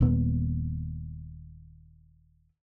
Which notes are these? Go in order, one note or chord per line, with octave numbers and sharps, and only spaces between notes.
D#1 A#2 B3